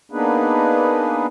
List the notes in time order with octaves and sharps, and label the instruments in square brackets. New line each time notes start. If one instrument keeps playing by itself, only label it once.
[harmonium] A#3 B3 D4 D#4 G#4 B4